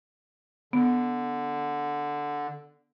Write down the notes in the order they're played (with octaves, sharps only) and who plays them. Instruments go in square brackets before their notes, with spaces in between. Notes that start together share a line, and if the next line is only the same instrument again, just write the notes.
[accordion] D3 [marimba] B3